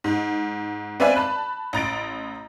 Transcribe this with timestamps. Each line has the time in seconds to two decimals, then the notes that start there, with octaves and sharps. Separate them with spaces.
0.04 G#2
1.00 C4 B4 D5 E5 F5 G#5
1.16 A5 B5 F#6
1.73 A1 A#5 A6 D7